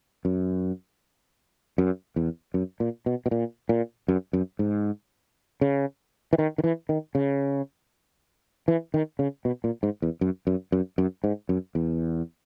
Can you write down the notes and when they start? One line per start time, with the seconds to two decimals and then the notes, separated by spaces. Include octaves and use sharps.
0.25 F#2
1.78 F#2
2.16 E2
2.54 F#2
2.80 A#2
3.06 B2
3.26 B2
3.31 A#2
3.69 A#2
4.08 F#2
4.33 F#2
4.59 G#2
5.61 C#3
6.33 E3
6.38 D#3
6.58 D#3
6.64 E3
6.89 D#3
7.15 C#3
8.68 E3
8.94 D#3
9.19 C#3
9.45 B2
9.64 A#2
9.83 G#2
10.02 E2
10.21 F#2
10.47 F#2
10.72 F#2
10.98 F#2
11.24 G#2
11.49 F#2
11.75 E2